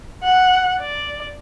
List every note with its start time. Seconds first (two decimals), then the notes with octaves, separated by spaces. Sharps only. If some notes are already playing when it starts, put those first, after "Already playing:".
0.23 F#5
0.80 D5